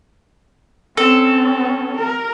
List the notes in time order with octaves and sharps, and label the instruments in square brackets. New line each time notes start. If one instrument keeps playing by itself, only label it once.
[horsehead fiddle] C4 C#4 [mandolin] A4
[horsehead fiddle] A#4